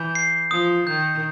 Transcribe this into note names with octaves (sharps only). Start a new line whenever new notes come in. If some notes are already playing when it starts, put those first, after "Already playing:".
Already playing: E3 G6
C7
F3 D#6
D#3 G6